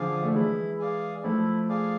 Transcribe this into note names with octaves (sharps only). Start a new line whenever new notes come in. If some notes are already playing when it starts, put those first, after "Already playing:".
Already playing: D3 F3 G#4 D5 F5
A3
E3 G#3 E4
G#4 D5 F5
F3 A3 E4
G#4 D5 F5